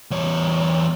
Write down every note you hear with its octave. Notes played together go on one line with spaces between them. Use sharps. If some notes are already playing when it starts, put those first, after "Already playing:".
E2 C#5